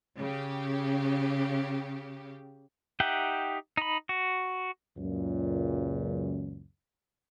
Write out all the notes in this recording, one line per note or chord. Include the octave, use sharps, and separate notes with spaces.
C#3 G4
D#4 G4 E5 F#5 G5
D#4 B5
F#4
C#2 F#2 A#2